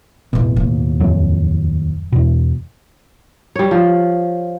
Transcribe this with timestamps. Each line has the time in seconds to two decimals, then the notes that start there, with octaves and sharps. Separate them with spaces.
0.33 A1 E2 B2
0.56 D#2 A2
1.00 D1 F2 F#3
2.13 E2 B2
3.56 G3 C#5
3.71 F3